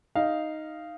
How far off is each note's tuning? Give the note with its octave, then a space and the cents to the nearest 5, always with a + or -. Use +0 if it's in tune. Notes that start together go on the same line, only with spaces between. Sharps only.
D#4 +0 F5 -10